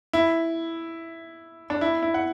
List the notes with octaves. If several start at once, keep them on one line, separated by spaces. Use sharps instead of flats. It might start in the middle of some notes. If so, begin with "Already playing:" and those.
E4
D4
E4
E4
F#5